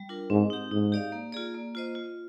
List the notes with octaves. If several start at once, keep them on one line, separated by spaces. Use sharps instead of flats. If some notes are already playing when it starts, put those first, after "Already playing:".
Already playing: G3
D4 F4 A#4
G#2 C4
D#4 G4
G#2 D#4
G4 D5 F5
A#3
F4 G#4 D5
A#3
F4 C5 D#5
F4